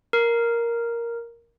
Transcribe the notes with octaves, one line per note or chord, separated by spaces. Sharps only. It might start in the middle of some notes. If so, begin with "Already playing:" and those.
A#4